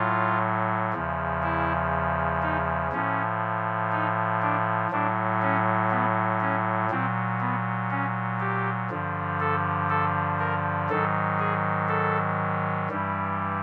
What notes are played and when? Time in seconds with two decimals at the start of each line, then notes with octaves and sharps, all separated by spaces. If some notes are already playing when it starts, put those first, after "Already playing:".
Already playing: A2 F#3 F4
0.93 E2 C#3 F3
1.43 E4
2.43 D#4
2.92 A2 F3 C#4
3.92 D#4
4.42 D4
4.91 A2 F#3 D4
5.42 C#4
5.91 B3
6.41 C#4
6.91 A#2 F#3 C4
7.40 B3
7.91 C#4
8.40 G4
8.90 G2 D3 F3
9.40 A4
9.90 A4
10.39 A#4
10.89 G#2 D#3 F#3 A4
11.39 G#4
11.89 A4
12.89 G2 E3 G3